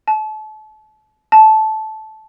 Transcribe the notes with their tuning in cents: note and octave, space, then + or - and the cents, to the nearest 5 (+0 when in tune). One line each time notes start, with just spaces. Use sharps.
A5 -35
A5 -15